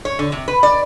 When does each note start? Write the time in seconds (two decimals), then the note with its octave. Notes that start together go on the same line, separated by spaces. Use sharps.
0.05 C#5
0.19 D3
0.32 C3
0.48 B4
0.63 D5